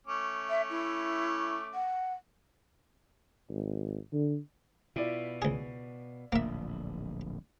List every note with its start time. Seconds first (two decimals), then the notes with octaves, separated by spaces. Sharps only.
0.07 A3 C#4 D6
0.50 E5
0.70 E4
1.74 F#5
3.50 G#1
4.13 D3
4.96 B2 E4 F4 D5
5.42 C#2 G#4
6.32 D1 A#1 A#3 E5